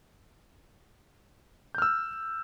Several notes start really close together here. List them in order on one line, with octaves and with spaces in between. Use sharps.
G6 F6 E6